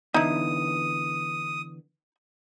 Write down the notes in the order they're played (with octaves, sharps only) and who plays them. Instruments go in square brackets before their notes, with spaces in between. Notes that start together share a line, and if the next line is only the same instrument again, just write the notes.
[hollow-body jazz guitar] D3 E3 B3 [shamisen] D#4 E4 [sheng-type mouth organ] D#6